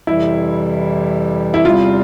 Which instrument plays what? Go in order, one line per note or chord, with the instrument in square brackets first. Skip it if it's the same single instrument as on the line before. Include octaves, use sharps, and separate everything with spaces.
[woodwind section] F2 C3 E3 G3 [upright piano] E4
[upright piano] E4
[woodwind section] E2 C3 G3 C4 [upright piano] F4